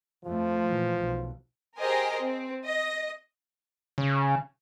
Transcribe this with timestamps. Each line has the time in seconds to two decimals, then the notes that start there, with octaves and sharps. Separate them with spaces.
0.25 F2 F3 A3
0.67 A#2 E3
0.98 B1
1.78 G4 G#4 A#4 C5 D#5 G#5
2.22 C4
2.64 D#5
3.98 C#3